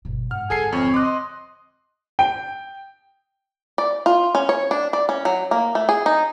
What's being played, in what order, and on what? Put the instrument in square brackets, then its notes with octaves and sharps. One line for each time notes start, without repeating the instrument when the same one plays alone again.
[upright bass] G1 B2
[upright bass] G#2 [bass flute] F#5 [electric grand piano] F6
[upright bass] G#1 D3 [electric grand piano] G#4 A4 C7 [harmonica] G#5
[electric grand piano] F2 [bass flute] C4 [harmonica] C#5
[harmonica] D#5 C6 [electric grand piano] D6 F#6
[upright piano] G5
[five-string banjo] D5
F4
C#4
C#5
D4
D5
C#4
F#3
A#3
A3
G#4
D#4